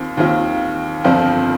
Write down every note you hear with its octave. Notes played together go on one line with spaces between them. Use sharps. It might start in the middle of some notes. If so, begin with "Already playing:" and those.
Already playing: D#2 D#3 C4 F4
D#2 D#3 C4 F4
G1 F2 F3 C4 F4